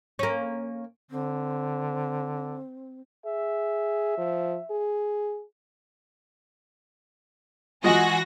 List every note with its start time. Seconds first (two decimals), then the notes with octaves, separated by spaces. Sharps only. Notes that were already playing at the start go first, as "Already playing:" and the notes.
0.19 A#3 C#4
1.11 D3 C4
3.26 G#4 E5
4.18 F3
4.71 G#4
7.84 E3 G#3 F4 F#4 D#5 F#5 G#5 A#6